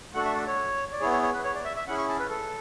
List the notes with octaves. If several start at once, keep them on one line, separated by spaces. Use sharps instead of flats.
A3 D4 F#4 A4 F#5
E5
D5
C#5
D5
B3 E4 G#4 C#5
C#5
C#5
B4
C#5
D5
E5
E5
C#4 E4 G#4 F#5
C#6
A5
B4
A4